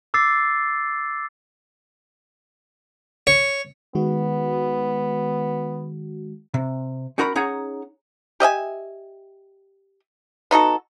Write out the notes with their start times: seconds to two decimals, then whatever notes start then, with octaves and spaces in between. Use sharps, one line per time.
0.14 D6 E6 A6 C7
3.27 C#5
3.95 D#3 G#3 B3 F#4
6.54 C3
7.18 C#4 D#4 F#4 A#4 A#5 B5
7.35 C#4 D#4 G#4 C#5 F#5 A#5
8.40 G4 D#5 E5 G#5
10.51 B3 D#4 F#4 A4